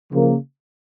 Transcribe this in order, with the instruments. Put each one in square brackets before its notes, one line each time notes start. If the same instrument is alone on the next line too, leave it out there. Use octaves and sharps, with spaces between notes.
[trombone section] C#3 F3 A#3